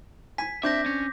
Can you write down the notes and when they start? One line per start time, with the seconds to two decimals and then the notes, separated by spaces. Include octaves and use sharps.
0.38 G#5 B6
0.63 C4 D4 E5 D6 G6 A#6
0.86 C#4